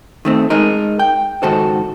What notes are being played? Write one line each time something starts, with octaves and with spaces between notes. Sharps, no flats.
D#3 A3 C4
G#3 D#4 A#4
G5
C#2 G#2 D#3 F#4 A4 C5